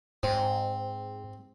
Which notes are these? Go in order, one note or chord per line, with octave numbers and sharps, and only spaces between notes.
G#2 C4